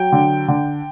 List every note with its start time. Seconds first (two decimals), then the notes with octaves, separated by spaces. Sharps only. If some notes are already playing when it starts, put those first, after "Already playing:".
Already playing: F#3 G5
0.12 D3
0.48 D3